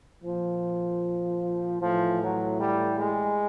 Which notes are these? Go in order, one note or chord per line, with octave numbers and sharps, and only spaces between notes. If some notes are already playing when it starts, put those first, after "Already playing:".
A#2 F3
A2 E3 F3
F#3
G3
G#3